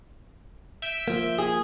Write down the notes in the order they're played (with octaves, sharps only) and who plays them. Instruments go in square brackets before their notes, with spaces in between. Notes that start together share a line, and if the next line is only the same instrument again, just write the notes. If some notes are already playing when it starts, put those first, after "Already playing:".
[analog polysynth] E5 G6 D7
[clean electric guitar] F3 A#3
[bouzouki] G#4